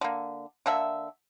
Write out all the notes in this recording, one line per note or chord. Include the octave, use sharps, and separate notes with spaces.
D3 A#3
D3 A#3 A4 E5